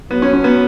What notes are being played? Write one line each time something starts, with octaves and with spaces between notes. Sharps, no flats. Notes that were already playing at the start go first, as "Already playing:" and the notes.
F#3 B3
C#4
C#4
B3